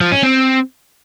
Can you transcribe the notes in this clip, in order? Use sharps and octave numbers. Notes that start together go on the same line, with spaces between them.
F3
C#4
C4